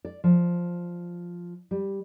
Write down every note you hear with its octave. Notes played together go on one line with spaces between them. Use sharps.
D5
F3
G3